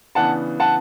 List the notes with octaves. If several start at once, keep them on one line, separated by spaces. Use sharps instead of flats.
C#3 E3 B3 D4 F#5 A5
F#5 A5